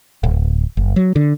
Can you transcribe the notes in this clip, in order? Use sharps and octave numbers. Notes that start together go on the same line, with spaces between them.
D1
F#1
F#3
D3